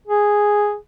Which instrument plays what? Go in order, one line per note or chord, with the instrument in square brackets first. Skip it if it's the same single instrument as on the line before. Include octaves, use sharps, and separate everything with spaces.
[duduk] G#4